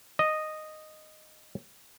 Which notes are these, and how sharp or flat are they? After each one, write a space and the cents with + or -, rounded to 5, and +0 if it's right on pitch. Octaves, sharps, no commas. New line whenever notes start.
D#5 -5